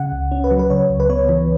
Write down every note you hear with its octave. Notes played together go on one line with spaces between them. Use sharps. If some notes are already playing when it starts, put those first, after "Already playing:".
Already playing: C#3 F#5
C#2
C#4
B4
F#3
B4
C#3 C#5
C#2
B4
B3 C#5
E3